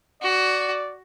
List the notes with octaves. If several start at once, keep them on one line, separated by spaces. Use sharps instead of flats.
F#4 D5